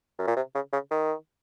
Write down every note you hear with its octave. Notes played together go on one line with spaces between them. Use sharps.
F#2
A#2
C3
C#3
C#3
D#3